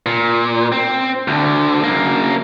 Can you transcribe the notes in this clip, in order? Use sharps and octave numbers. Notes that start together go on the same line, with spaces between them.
A#2
C4
D2 D3
F#2 A#3